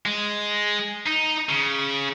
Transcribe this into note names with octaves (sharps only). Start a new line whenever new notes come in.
G#3
D#4
C#3